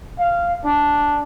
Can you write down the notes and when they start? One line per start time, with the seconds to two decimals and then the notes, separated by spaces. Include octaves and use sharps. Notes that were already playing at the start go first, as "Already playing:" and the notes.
0.19 F5
0.65 D4